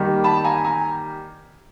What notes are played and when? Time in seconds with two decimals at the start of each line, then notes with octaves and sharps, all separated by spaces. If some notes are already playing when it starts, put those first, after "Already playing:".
Already playing: D#3 G3 A#3
0.24 A5 B5
0.44 G#5 A#5
0.64 G#5 A#5